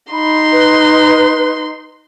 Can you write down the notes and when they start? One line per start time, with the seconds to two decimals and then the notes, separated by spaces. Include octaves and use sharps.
0.13 D#4 B5 C6
0.52 B4